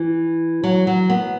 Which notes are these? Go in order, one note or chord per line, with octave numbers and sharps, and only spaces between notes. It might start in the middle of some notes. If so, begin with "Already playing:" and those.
Already playing: E3
F#3
F#3
B3